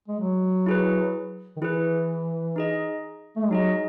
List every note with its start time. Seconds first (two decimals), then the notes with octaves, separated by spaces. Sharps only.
0.08 G#3
0.20 F#3
0.66 E4 G#4 B4
1.57 D#3
1.61 E3 E4 G#4 B4
2.56 D#4 G#4 D#5
3.36 A3
3.43 G#3
3.50 F#3 D#4 G#4 D#5